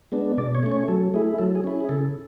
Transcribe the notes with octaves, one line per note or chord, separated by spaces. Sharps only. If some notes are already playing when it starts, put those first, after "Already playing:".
G#3 B3 D4
B2 D5
C#5
A3 C#4
C#5
F#3 A4
A3 E4 G#4
F#3 A4
G#4
C#4 E4
G#4
C#3 A4